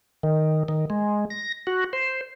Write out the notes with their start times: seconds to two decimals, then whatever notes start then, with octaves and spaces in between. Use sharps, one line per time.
0.23 D#3
0.68 D#3
0.90 G#3
1.30 A#6
1.67 F#4
1.93 C5